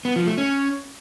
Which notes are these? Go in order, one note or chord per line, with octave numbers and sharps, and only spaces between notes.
B3
F3
A3
C#4